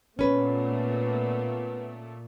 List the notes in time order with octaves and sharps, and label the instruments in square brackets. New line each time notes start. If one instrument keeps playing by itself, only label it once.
[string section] A#2 A3 [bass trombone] B3 [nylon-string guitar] C#4 B4